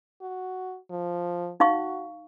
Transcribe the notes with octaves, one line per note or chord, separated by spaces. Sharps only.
F#4
F3
D#4 F#4 F5 C#6